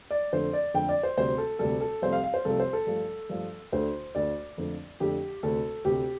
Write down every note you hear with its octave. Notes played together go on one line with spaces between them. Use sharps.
D5
F2 D3 A3 C5
D5
F2 D3 A3 G5
D5
C5
D2 C3 G3 C5
A4
D2 C3 G3 A4
A4
C2 C3 F3 A3 C5
F5
F5
C5
C2 C3 F3 A3 A4
C5
A4
G2 F3 A3
G2 F3 A3
D2 D3 A3 C5
D2 D3 A3 D5
F2 D3 A3
F2 D3 A3 G4
D2 C3 A3 A4
D2 C3 A3 G4